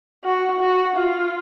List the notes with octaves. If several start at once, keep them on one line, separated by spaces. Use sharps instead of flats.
F#4
F#4
F4